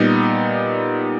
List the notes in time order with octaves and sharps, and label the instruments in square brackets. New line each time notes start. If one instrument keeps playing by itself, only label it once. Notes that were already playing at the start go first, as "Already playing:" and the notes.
Already playing: [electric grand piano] A#2 G3 B3 D#4